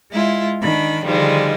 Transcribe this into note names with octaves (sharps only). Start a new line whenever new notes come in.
G#3 E4 F4
D#3 D4 B5
D3 D#3 F3 G3 G#3